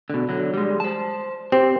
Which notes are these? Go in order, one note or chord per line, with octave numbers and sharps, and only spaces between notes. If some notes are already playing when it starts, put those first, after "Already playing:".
B2 D3
D3 F#3
G3 G#3
C5 A5
C4 G4